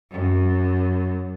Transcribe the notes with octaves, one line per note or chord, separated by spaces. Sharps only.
F#2